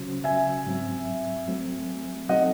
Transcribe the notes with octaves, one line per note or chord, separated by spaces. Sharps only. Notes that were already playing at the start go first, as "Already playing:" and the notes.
Already playing: C#3 F#3 C#4 F#4 C5
E5 G#5
G#2 F#3 C4
F#3 A3 C4
F#3 C4 D#4 A4 D#5 F#5